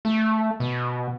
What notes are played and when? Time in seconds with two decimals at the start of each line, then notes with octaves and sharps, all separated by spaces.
0.05 A3
0.60 B2